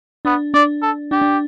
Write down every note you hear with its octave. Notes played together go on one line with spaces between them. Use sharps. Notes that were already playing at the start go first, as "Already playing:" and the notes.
B3 D4
D4 D5
A4
D4 G4
D4